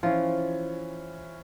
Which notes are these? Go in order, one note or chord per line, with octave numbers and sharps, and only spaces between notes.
E3 F3 C#4 F4